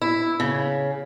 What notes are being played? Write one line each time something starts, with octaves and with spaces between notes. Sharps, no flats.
E4
C#3